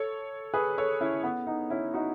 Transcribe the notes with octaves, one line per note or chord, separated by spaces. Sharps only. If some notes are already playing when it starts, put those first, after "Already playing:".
Already playing: A4 C#5
G#4 B4
A4 C#5
C#4 E4
B3
B3 D#4
C#4 E4
D#4 F#4